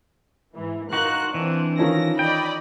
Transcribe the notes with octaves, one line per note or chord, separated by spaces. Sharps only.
G#2 E3
D#4 F4 F#4 A#4 F#6
E3 C4 D4
D#3 F3 C#4 A#6
D5 D#5 G5 B5